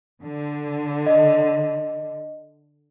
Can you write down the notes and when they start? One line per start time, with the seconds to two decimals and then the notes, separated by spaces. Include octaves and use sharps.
0.22 D3
1.06 D#5